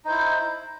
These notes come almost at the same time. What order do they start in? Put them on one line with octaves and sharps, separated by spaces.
D#4 C5 E4